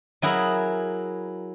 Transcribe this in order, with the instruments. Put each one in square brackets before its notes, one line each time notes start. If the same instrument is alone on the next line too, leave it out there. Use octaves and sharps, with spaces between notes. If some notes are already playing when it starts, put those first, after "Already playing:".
[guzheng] F#3 E4 G#4 A#4